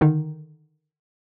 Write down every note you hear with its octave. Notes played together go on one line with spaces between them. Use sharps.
D3 D#3 D#4